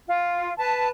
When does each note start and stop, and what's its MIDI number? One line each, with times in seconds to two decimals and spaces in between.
0.07 0.54 65
0.58 0.88 71
0.58 0.88 81